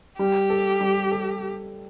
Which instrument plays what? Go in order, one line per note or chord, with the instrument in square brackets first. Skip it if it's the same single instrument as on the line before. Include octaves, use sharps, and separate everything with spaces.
[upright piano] G3 [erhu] G4
[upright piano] A4
G3
A4